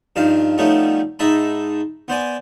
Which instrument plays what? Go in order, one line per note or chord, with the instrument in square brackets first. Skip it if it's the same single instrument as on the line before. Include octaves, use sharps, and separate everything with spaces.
[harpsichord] G2 D#3 F3 F5
F3 G3 A3 B3 C#4 D#4
G#2 D#4 D#5 E5 A5 B5
B3 C5 D5 G#5